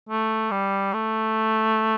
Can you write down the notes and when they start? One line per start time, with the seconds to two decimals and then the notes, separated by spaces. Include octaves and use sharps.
0.09 A3
0.51 G3
0.94 A3